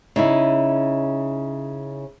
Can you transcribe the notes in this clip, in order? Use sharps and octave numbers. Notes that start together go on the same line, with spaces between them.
C#3 D#4 E4